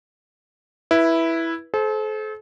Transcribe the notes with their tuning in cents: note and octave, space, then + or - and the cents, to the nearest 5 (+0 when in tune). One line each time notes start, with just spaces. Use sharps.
E4 +0 B4 -20
A4 -40 C5 +0